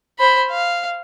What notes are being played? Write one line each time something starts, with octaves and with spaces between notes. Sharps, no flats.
C5 B5
F5